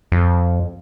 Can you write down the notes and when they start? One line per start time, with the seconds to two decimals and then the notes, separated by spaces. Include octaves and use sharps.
0.12 F2